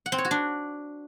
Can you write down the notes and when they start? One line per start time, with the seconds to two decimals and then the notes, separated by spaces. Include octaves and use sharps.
0.06 F#5
0.12 C4
0.18 C#5
0.25 F#4
0.31 D4